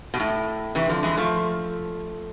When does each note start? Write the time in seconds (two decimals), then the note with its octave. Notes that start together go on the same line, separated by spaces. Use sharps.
0.14 B2
0.20 A2
0.75 C3 E3
0.89 D3 F3
1.03 E3 G#3
1.17 F3 A3